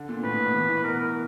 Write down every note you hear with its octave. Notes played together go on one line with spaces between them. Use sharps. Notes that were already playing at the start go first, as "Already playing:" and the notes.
Already playing: D3
A#2
A2 B4
A2
B2
E3
E3
B2 A#4
A#4